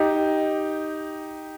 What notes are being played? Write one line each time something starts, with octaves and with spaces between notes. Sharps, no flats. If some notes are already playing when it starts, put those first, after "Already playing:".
Already playing: D#4 G4